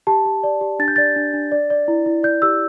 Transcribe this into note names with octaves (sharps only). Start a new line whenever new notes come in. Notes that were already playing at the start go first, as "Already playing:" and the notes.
G4 A5
G4
D5
G4
D4 A6
G6
D5 A6
D4
D4
D5
D5
E4
E4
D5 G6
G4 E6